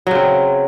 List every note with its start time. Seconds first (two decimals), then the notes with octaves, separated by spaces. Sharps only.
0.07 F#3
0.11 C#3
0.15 C4